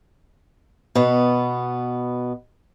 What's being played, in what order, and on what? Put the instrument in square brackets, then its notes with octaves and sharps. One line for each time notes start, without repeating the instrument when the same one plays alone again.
[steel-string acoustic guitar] B2 B3